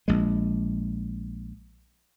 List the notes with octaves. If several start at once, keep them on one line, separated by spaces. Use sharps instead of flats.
A#1 G#3